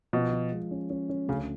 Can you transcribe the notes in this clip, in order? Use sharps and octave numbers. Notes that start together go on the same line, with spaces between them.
B2 F3
F3
G#3
C#4
C#4
C#4
D2 C#3